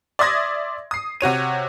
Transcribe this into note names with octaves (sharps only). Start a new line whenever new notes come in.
D5 E5 C6 D#6 G#6 A#6
D#6 C7
C3 F#4 C#5 D#7